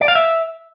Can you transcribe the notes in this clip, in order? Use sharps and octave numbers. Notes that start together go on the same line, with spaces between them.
D5
F5
E5